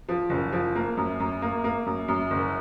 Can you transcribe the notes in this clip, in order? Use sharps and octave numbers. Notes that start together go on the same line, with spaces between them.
F3
F#1
F3
A#3
F#2
F#2
A#3
A#3
F#2
F#2
F#1